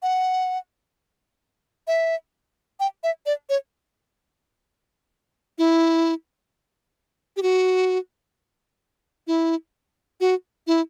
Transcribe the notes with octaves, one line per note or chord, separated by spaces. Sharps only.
F#5
E5
G5
E5
D5
C#5
E4
G4
F#4
E4
F#4
E4